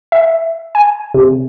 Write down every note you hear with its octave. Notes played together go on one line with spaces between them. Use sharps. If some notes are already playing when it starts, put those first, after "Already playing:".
E5
G#5
C3